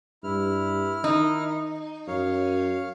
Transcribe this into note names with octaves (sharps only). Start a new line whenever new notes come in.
G2 E4 F6
D#3 D#4
F#2 C#5 F5